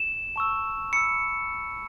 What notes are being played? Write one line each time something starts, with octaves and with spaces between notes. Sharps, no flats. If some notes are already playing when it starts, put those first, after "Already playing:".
Already playing: E7
A5 C#6 E6
B5 E6 C#7